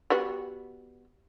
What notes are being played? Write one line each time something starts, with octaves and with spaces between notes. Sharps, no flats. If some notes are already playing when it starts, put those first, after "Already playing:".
G3 B3 F#4